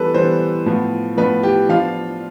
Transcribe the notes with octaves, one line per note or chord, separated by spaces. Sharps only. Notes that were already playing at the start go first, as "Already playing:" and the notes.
Already playing: E3 G3 B3 A4 B4
E3 G3 B3 C5
A2 F3 B3
A2 F3 B3 B4
G4
F3 B3 D4 F4 F5